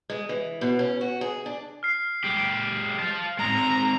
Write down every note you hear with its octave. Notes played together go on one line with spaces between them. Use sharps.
G#3
E3
B2
C#4
F#4
G#4
D4
F6 C7
G#3 G4
F5 A5
G#3 C4 A#5